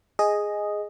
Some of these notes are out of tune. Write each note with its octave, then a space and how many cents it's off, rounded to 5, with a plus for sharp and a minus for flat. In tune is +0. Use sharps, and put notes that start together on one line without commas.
G#4 +0 D#5 +0